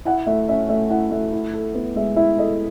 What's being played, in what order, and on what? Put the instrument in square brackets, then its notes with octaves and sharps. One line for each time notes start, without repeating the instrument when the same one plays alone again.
[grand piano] E4 [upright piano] F#5
[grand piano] A3 [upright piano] E5
[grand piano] C#4 [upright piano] E5
[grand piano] A3 [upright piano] E5
[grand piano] E4 [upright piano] F#5
[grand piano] A3 [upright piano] E5
[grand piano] E4
A4
B3
[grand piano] G#3 [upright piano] E5
[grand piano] E4 [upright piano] E5
[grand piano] A4 [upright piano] D#5